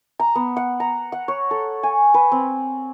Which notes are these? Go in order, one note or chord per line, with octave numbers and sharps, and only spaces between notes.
A#5
B3
F#5
A#5
F#5
C#5
A4
G#5
B4
C4